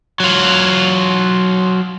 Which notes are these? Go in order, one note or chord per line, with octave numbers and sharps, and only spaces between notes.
F#3 F4